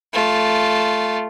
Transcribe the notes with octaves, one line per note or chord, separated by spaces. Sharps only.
A3 F4